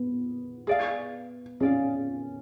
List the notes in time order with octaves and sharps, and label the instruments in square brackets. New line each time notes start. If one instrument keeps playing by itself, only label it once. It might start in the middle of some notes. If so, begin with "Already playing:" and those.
Already playing: [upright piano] B3
[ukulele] G#4 D5 F5
[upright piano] C#4 [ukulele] G#4 D5 F5